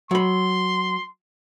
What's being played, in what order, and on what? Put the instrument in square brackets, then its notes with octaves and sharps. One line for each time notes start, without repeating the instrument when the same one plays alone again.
[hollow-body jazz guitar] F#3 B5 [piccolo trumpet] C6